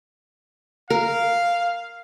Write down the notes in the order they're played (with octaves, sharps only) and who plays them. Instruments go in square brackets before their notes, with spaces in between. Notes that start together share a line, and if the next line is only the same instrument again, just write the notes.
[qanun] A#4 [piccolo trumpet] F5